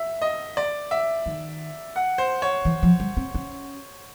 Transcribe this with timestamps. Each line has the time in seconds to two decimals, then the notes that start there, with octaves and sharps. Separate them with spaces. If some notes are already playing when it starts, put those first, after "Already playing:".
Already playing: E5
0.22 D#5
0.57 D5
0.91 E5
1.26 D#3
1.96 F#5
2.18 C5
2.42 C#5
2.65 E3
2.83 F3
3.00 G3
3.17 C4
3.34 C#4